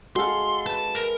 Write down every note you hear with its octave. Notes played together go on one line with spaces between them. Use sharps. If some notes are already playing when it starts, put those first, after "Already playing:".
G#3 F#4 A4 F5 C6
B4 A5
A#4